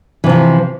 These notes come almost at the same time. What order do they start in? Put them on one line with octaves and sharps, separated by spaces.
E3 C3 F3